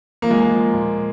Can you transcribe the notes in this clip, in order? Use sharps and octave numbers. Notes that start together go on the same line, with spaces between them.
F3 A#3
G#3
A#3
F3
A#2